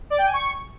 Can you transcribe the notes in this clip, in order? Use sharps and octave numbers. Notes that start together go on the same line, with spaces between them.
D5
G5
G#5
C#6